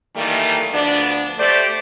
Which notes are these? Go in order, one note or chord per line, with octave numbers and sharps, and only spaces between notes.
D#3 E3 G3 A3 A#3
D2 F3 B3 D4
A3 G4 C5 D5